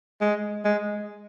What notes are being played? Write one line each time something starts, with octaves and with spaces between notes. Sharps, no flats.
G#3
G#3